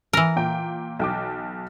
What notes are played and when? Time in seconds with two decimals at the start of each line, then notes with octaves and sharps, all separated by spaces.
0.13 E3 A#4
0.36 A#2 G5
0.99 B1 G5 D6